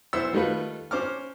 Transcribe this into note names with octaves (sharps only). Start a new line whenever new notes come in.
B1 E4 C5 E5 F#5 E6
D#3 G3 A3 D#4 F4 B4
C#4 C5 D6 F6